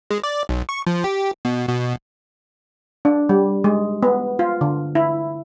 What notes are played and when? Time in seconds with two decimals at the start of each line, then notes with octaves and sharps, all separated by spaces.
0.10 G#3
0.24 D5
0.49 B1
0.69 C#6
0.87 F3
1.04 G4
1.45 B2
1.69 B2
3.05 D4
3.29 G3
3.64 G#3
4.03 B3
4.39 F4
4.61 D3
4.95 E4